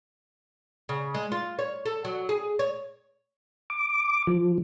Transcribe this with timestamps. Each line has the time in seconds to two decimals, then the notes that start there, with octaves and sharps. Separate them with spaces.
0.89 C#3
1.14 G#3
1.32 F4
1.59 C#5
1.85 A4
2.05 F#3
2.29 G#4
2.59 C#5
3.70 D6
4.27 F3